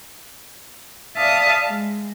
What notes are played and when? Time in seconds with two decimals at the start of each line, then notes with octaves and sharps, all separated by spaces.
1.16 D5 E5 F5 A5 D#6
1.67 G#3